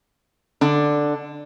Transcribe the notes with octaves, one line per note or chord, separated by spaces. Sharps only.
D3 D4